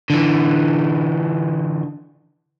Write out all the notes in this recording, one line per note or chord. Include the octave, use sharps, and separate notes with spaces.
D3 E3